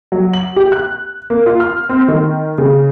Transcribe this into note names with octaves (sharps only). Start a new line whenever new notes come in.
F#3
F#7
G4
F#6
A#3
F4
F6
C4
D#3
C#3